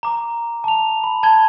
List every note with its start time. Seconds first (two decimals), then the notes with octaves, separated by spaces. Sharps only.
0.03 A#5 D6
0.64 A5 F7
1.04 B5
1.23 A5 G#6 G7